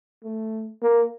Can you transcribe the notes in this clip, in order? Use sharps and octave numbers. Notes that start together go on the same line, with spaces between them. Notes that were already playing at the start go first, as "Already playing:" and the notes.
A3
A#3